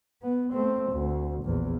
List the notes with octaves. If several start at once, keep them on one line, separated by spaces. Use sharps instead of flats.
B3
A3 C4
D2
A#1 E2